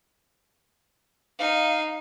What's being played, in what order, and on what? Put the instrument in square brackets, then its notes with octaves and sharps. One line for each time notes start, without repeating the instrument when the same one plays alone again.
[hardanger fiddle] D#4 [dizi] F5